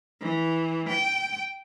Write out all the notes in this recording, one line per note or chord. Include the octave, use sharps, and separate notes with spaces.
E3
G5